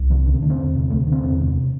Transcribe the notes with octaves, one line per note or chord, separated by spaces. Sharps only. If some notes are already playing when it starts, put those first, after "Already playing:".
Already playing: C2
C3 E3
D2 D4
C4
D3 D4
C4
E2
C3
D2 A3
D3
C4
E2
C3